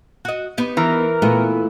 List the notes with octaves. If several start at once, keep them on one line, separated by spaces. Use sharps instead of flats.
F#4 D#5
B3 D#4 G4
E3 A#4
A#2 A3 B3 E4